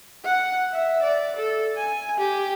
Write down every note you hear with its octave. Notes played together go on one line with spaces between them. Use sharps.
F#5
E5
D5
A4
G#5
G4